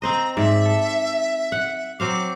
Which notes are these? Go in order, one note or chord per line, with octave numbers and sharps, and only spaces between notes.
C4 C5 D#5 A#5
G#2 D5 E5
A4
F#5
F#3 C4 F5 D6